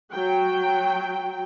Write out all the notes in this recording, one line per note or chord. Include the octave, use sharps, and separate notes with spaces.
F#3 G5